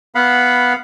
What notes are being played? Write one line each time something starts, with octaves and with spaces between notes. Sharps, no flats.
B3 F5 F#5 B5